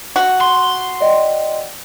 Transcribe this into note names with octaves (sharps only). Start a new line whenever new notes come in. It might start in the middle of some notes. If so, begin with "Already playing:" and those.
F#4
C6
D5 D#5 G5